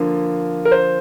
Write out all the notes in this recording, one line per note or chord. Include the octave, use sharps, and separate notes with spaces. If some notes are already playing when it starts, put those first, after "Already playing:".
Already playing: D3 F3 A#3
A#4
C5